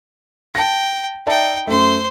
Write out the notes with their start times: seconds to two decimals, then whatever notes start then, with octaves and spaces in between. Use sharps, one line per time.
0.55 G5 A5 A#6
1.27 D#4 D5 E5 G5 A5
1.67 F#2 A3 C5 C6